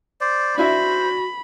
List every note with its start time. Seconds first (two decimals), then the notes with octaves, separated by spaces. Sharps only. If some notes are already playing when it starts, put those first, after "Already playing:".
0.21 C5 D5
0.57 D4 E4 F#4 C5 E5 B5